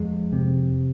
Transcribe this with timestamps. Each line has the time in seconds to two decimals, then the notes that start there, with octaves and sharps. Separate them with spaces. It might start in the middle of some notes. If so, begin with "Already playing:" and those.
Already playing: F2 G#3
0.32 C3